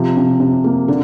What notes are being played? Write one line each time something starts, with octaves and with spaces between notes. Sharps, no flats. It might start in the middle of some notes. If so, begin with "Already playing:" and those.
Already playing: C3 F3
C3
C3
A#3
D3